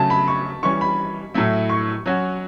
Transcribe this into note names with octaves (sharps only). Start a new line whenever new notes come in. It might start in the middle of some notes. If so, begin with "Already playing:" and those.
Already playing: C#3 F#3 A3 A5
B5
C#6
E3 G3 C#4 C#6
B5
A2 F#3 A3 E4
C#6
F#3 C#4 F#4